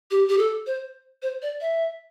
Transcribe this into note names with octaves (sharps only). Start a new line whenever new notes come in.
G4
G4
A4
C5
C5
D5
E5